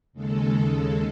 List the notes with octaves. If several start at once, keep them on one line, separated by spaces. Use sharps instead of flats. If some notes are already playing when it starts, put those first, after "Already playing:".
D#2 C#3 G#3 A4